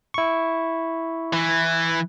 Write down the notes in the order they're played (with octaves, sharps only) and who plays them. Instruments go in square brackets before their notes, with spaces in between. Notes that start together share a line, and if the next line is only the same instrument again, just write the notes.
[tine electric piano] E4 C#6
[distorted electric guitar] E3